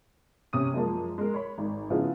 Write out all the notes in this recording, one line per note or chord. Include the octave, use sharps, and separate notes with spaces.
C3 C#4 D#6 D#7
F#2 F3 G#3 A#3 A5
G#3 A#4
C#5 B5
G#1
C#3 F3 B3 E4 F4 G#4